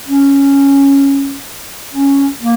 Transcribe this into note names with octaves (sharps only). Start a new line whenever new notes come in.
C#4
C#4
A#3